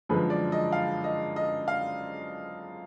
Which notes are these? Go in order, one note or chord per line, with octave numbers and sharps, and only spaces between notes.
F#2 D3 F3 G#3 B4
D5
D#5
F5
D#5
D#5
F5